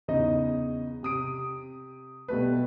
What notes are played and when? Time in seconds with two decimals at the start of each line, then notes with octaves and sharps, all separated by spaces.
0.08 E2 C#3 D#4 D#5
1.03 C3 D#6 D7
2.28 B2 G3 A3 B4